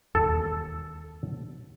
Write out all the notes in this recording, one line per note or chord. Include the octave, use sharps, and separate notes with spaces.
E1 D#2 A4